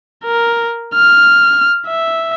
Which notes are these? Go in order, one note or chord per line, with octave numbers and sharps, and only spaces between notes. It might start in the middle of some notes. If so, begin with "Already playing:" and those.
A#4
F6
E5